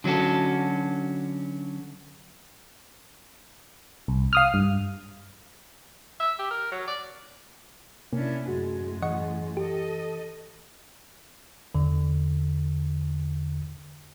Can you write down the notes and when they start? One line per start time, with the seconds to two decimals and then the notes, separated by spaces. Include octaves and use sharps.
0.04 D3 F#3 C#4 F#4 A4
4.08 C2
4.33 F5 D#6 F6
4.54 G2
6.20 E5
6.39 G4
6.51 A#4
6.72 F#3
6.87 D5
8.13 C3 A#3 C#4 D4 E4
8.48 F#2 A2 G#3 F#4
9.02 E3 D#5 F#5 C#6
9.57 G4 A4 D#5
11.75 E2 D3